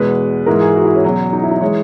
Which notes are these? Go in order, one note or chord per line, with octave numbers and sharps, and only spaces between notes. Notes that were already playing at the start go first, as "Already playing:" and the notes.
Already playing: E2 B2 G#3 B4
G#2 E3 G#3 A#4
G#4
F#4
E4
C#4
E2 B2 F#3
D#4
E4
D#4
E3 G#3 C#5